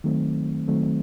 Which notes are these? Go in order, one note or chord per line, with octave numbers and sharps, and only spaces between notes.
D#3 F#3 A3 C4
D#3 F#3 A3 C4